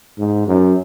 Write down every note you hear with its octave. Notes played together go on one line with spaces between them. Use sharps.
G#2
F#2